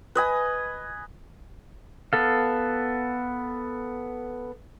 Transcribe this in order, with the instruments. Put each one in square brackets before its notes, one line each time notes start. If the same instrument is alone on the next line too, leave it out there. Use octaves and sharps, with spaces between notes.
[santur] B4 D#5 G#5
[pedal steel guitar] B3 A4 F5